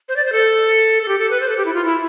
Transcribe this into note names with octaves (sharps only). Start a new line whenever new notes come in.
C5
D5
C5
A4
A4
G4
A4
B4
C5
A4
G4
E4
F4
E4